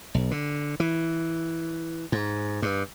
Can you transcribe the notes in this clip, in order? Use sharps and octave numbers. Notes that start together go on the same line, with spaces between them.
B1
D3
E3
G#2
G2